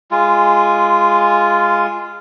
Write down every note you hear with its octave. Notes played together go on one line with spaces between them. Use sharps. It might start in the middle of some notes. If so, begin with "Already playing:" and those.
G#3 F4